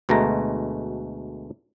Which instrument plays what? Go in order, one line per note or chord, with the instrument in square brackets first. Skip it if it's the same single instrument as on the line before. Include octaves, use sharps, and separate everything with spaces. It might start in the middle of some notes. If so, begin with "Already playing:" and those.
[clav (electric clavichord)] D2 B2 G#3 A3 A#5